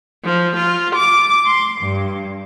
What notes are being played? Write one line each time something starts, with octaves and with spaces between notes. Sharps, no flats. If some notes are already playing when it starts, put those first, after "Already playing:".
F3
F4
D6
C6
G2